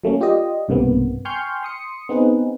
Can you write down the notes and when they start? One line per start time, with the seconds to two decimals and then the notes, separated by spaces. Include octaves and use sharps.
0.03 F#3 A3 A#3 C#4
0.21 F4 G4 D5 D#5
0.68 B1 G2 C3 A#3 B3
1.25 G5 G#5 C6 C#6 F6 G6
1.63 C6 D#6 C#7
2.09 B3 C4 D#4 G#4 B4